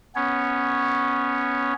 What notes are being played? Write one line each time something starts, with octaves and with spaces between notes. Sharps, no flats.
B3 C#4 C#5